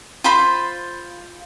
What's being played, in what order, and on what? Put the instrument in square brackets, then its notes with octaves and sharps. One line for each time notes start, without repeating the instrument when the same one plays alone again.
[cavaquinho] F4 C5 B5